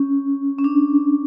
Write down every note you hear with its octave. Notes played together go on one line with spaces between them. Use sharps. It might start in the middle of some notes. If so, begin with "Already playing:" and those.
Already playing: C#4
C#4
D4